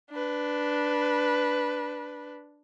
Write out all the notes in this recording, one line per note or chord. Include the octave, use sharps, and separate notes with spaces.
D4 B4